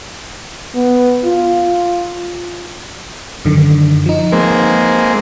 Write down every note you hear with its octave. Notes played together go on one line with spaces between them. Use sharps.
B3
F4
F#2 D3 D#3
F3 D#4
G#3 A#3 C4